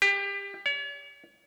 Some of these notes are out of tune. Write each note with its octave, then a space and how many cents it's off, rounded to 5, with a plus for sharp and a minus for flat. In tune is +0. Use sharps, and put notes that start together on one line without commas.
G4 +25
C#5 +40